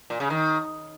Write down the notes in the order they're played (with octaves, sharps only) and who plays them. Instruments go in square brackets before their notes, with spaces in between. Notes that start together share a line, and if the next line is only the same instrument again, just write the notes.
[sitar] A#2
C#3
D#3